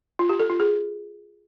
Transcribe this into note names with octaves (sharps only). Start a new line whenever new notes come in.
F4
G4
A4
F4
G#4